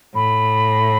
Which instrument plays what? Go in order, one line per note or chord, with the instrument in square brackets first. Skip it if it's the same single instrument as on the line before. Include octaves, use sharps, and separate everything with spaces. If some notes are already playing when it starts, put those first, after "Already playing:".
[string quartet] A2 [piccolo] B5